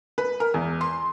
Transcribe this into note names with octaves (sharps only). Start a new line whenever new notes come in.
B4
A#4
E2
C6